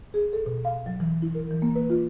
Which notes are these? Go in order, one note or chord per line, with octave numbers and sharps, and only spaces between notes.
G#4
A4
B2
F5
F#3
E3
E4
A#4
E3
A#3
B4
F4